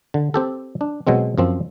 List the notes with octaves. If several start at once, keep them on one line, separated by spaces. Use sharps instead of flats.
D3
C4 G4 A4
D4
B2 F#3 G#3 C4
F#2 F3 C4